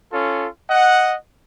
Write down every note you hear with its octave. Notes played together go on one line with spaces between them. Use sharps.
C#4 F4 A4
D#5 F#5